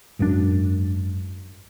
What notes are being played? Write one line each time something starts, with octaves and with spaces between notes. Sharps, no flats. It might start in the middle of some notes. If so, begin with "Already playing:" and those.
G#1 F#2 D#3 D4